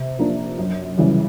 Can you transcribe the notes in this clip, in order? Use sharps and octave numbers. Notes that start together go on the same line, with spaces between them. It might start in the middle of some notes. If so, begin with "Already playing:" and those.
Already playing: C3
F3 A#3 D4
F#2
C#3 E3 G3